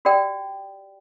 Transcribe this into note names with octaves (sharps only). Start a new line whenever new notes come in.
F#4 G4 D5 G5